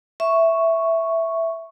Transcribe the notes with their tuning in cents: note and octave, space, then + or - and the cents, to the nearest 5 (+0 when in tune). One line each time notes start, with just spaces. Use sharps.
E5 +0 C#6 +0